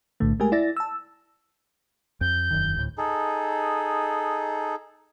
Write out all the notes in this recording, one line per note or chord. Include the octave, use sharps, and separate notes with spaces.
B1 A2 D3 A3
G#3 A3 G4 A#4 G#5
E4 D5 E5 A6 A#6
A5 E6
F2 G6
E1 F#2 D#3
D2 A2
D#4 G#4 A4